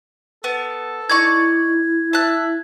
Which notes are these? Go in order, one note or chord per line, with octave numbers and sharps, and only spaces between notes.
B3 A4
D#4 E4 D5 C#6 G#6
E5 A5 F#6